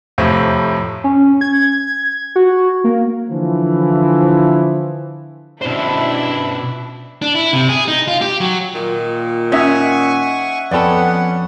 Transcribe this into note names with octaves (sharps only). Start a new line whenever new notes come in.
F2 A2 C3 A3 C4
C#4
G#6
F#4
A#3
D3 E3 F3
B2 D4 E4 C5
D4
E4
C3
G#4
D#4
F4
G4
F#3
A#2 D#3
C#4 D#4 E5 F#5 G#5 C#6 D#6 G#6
F2 B3 C#4 A4 D5 F#5 G5 B5